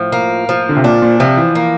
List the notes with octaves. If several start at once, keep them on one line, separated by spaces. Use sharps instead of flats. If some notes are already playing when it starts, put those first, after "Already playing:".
Already playing: A2 F3
A#3
F3
D3
C3
A#2 D4
A#2
C3 F3
E3
A#3